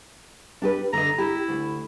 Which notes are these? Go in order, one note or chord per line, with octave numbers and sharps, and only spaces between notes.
D4 G4 B4
D3 D#5 A#5
E4 G4
D2